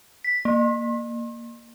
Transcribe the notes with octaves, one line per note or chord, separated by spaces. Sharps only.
B6
A#3